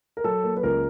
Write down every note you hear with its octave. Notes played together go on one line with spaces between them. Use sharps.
A#4
F#3 A4
A#3
B4
C#2 A#4